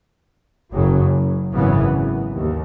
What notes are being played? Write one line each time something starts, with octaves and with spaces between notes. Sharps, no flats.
F#1 F#2 C#3 F#3
G#1 F#2 C#3 E3 B3
D#2